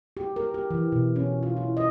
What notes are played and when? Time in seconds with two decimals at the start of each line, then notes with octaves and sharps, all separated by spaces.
0.17 G4
0.36 A#4
0.54 G4
0.70 E3
0.92 B2
1.16 C#4
1.43 F4
1.57 E4
1.77 D#5